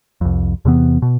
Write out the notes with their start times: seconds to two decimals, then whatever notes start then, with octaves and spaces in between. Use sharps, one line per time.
0.21 C2 F2
0.65 E2 C3 E3 B3
1.02 B2